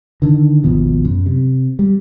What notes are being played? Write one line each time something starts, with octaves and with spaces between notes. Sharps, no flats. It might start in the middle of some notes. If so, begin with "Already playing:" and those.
D3 D#3
G#1 D#2 B2 F3
F#2
C3
G3